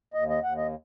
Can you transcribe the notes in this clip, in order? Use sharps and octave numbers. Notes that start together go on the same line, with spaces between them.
D#2 D#5
D#5
D#2 F#5
D#5